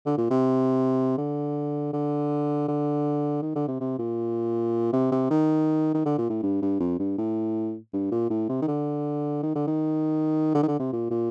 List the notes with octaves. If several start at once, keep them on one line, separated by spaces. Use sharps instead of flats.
D3
A#2
C3
D3
D3
D3
D#3
D3
C3
C3
A#2
C3
C3
D#3
D#3
D3
A#2
A2
G2
G2
F2
G2
A2
G2
A#2
A2
C3
D#3
D3
D#3
D3
D#3
D3
D#3
D3
C3
A#2
A#2